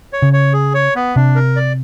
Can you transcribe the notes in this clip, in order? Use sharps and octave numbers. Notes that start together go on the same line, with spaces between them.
C#5
C#3
C#5
G#4
C#5
B3
C3 D4
A#4
D5